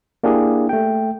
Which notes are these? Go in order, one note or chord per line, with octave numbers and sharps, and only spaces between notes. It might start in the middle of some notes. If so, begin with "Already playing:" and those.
A#3 D4 E4 G4 G#4
A3 G5